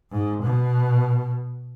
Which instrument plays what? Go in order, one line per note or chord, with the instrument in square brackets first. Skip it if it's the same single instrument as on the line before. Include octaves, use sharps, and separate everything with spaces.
[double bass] G#2
B2